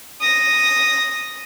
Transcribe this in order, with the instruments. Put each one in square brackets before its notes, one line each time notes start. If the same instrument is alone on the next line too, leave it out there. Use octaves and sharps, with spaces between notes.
[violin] D#6 A#6